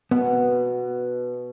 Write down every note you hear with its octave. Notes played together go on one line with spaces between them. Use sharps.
B2 B3